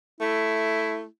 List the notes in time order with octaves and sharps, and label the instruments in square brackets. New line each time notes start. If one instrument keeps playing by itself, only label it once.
[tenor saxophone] A3 [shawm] E4